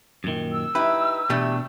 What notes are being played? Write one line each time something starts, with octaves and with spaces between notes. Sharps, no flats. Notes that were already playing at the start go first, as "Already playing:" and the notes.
F#2 A#2 D#3
E6
D#4 E4 G4 B4
B2 E3 A3 D4 G4